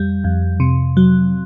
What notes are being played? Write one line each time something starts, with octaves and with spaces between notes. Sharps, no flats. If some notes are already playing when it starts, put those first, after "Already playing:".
Already playing: F2 G3
F2
C3
F#3